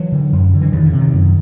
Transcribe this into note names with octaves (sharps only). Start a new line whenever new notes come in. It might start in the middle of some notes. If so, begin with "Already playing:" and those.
Already playing: E3 F#3
D3
F#2
D3
E3
F2 D#3 F3
D3
C3
D#3
F#2